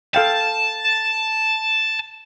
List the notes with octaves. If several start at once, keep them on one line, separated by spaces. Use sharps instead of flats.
A4 F5 G5 A5